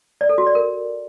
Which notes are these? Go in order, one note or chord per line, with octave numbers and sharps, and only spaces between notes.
D5
A4
F#4
D5
A#4